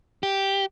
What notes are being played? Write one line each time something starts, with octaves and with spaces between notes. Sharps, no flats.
G4